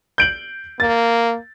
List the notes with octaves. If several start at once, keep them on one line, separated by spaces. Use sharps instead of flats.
G6 D7 F#7
A#3 A6